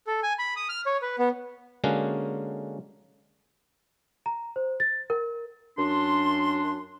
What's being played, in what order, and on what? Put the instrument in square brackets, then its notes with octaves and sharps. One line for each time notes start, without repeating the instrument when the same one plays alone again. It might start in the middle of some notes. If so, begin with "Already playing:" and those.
[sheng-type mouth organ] A4
G#5
B5
D#6
F6
C#5
B4
B3
[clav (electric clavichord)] D3 G#3 A#3 C#4 F#4 A#4
[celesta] A#5
C5
A6
A#4
[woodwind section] F#2 D4 C6